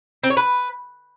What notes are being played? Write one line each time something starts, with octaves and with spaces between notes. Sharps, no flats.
C4
C#5
B4